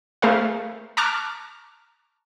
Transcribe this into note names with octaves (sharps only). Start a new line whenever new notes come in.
A3 G#4 A#4 C5 F5
A5 A#5 C#6 D6 F6 F#6